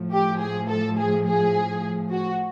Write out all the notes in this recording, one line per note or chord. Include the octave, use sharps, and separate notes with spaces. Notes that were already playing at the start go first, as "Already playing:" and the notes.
Already playing: A2 F3
G4
G#4
A4
G#4
G#4
F#4